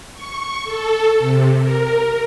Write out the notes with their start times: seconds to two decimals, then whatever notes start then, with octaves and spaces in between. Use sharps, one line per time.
0.14 C#6
0.64 A4
1.19 C3
1.60 A#4